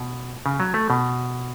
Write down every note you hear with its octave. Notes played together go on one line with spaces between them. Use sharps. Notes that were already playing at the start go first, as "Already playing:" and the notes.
Already playing: B2
C#3
F#3
A3
B2